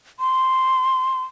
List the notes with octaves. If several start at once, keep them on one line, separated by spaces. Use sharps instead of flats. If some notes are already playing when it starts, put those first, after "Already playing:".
C6